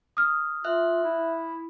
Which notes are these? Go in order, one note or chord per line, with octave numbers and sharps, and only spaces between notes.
D#6 F6
F4 E5 F#6
E4